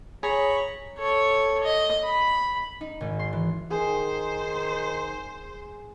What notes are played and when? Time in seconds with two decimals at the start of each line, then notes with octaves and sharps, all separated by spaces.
0.23 G#4 C#5 A#5 B5 C#6
0.98 A4 C#5
1.64 D#5
2.05 B5
2.81 D#4
3.01 G#1
3.19 C6
3.33 E3
3.71 D#3 G#4 C5